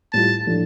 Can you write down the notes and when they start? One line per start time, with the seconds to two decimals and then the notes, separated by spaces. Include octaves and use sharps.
0.13 A2 G3 F4 A5
0.47 A2 F3 A3 D4